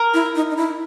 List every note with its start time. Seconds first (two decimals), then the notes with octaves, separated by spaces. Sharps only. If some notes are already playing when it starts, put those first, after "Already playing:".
Already playing: A#4
0.14 E4
0.35 D#4
0.51 D#4
0.57 E4